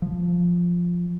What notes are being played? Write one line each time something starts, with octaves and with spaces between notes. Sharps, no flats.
F3